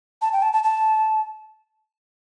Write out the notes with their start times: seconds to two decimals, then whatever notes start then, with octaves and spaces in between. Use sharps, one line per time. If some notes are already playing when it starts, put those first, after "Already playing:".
0.22 A5
0.33 G5
0.42 A5
0.53 A5
0.63 A5